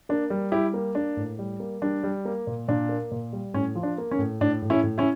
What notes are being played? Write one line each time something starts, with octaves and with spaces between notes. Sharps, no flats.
A#3 D4
G3
G3 E4 G4
A#3
A#3 D4
A2
G3
A#3
G3 D4
G3
A#3
A#2
A#2 D4
A#3
A#2
G3
A2 C#4
F3
D4
A#3
C#4
A2
A2 D4
A2
C#4 E4
A2
C#4 E4